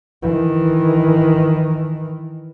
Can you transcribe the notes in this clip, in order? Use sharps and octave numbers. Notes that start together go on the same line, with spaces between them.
D#3 E3